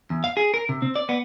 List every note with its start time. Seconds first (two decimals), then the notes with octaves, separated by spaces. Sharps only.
0.10 E2
0.24 F5
0.37 G#4
0.54 A#4
0.69 C3
0.82 C4
0.96 D5
1.09 B3